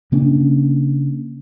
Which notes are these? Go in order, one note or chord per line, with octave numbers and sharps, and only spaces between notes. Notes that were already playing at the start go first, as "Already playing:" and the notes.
C#3 A#3 C#4 D4